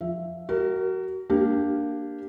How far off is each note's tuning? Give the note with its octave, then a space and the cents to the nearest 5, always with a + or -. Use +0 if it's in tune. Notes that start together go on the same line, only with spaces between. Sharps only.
F3 +5 E5 +0
F#4 +30 A#4 -15
A#3 +0 D4 +0 G4 +0